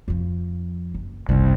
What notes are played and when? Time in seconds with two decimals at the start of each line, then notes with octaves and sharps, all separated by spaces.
0.08 F2 F3
0.94 F#1
1.29 F#1 C2 C#3